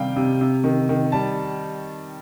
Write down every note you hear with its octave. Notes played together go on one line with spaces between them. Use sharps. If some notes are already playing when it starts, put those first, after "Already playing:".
Already playing: C3 D#3 G3 F5 G5
C3
C3
D#3
D#3
G3 A5